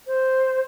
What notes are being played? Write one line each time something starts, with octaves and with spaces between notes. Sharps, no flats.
C5